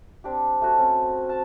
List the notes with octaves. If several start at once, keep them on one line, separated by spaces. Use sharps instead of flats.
C4 D4 G4
A3 F#4 C#5
C4 C#4
A5